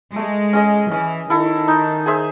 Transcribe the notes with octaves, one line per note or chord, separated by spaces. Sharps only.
G#3 A3
C#4 G#4 D#5
E3 C#4
D#3 E4 A4
D#4
G#4 C5 E5